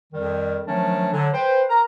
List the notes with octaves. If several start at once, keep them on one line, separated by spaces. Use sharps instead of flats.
F2 D#3 G3
D#3 F3 F#3 A3 C#4 D4
D3 F#3
B4 C5 G5
A#4 A#5